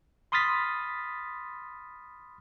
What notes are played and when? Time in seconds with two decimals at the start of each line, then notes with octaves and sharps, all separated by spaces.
0.32 B5 C6 D#6 F6 A6 B6